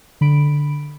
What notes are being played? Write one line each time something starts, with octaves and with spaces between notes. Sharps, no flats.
D3 B5 D7